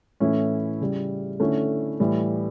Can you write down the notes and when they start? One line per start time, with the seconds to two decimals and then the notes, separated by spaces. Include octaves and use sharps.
0.20 A2 E3 A3 C#4 E4
0.81 C#3 G3
1.40 D3 A3 C#4 E4
2.00 A2 E3 G3